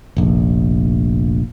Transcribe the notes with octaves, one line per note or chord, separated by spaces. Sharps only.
F1 A#1